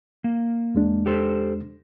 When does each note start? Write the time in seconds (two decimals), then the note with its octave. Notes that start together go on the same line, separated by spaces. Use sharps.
0.24 A#3
0.75 E2 G#3 D4
1.06 G4 A4 C5